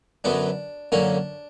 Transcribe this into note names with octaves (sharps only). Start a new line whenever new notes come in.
F#2 D3 F#3 B3 D4
F#2 D3 A#3 C#4 D4